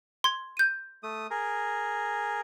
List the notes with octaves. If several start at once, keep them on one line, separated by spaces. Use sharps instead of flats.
C6 G#6
G6 D#7
A3 D#6
G#4 A#4